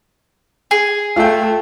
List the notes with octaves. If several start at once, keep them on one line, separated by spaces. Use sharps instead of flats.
G#4
A3 F4 G5